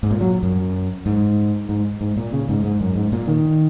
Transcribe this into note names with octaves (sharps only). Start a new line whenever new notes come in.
G#2
A#2
F#3
F#2
G#2
G#2
G#2
A#2
C#3
G#2
G#2
F#2
G#2
A#2
D#3